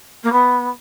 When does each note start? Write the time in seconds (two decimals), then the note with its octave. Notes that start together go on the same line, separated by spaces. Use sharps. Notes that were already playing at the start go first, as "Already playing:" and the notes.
0.23 A#3
0.32 B3